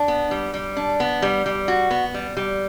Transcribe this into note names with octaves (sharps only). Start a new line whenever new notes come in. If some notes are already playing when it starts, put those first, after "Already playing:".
Already playing: D4
B3
G3
G3
D4
B3
G3
G3
F#4
B3
G3
G3